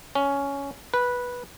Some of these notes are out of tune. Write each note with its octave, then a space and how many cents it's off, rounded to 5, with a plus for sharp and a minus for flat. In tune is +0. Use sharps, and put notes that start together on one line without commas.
C#4 +10
B4 -10